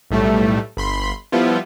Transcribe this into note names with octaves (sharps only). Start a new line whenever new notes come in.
B1 A2 G3 A3
G1 B5 C6
F3 G3 B3 E4 F4